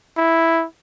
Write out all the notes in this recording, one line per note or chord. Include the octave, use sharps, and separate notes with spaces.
E4